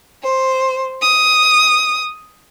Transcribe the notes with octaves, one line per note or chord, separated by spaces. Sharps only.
C5
D#6